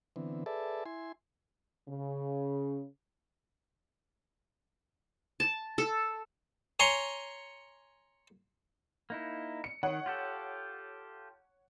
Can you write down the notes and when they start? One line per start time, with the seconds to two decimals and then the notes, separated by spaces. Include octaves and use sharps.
0.16 D3 E3 B3 C4
0.46 G#4 A4 B4 D5 E5 A5
0.86 E4 G#5 C6
1.89 C#3
5.40 A5
5.78 A4
6.80 C#5 G#5 A#5 C6 C#6
9.10 A#3 D#4 E4
9.64 C#7
9.83 D#3 C#5 F#5
10.06 F4 G4 A4